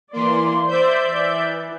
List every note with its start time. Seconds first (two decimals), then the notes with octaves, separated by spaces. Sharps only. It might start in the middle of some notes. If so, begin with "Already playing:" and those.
0.13 E3 A#3 D5 C6
0.68 C5 D5 E5 G6
1.05 E3